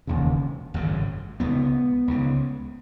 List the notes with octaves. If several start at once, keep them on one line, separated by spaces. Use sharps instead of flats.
E1 D#2 C#3
G#1 F#2 C#3
C#2 B2 B3
C#2 C#3